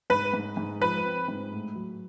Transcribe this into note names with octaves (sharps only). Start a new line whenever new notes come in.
G#2 B4
G#2
G#2
F3 B4
C4
G#2
A2
F#3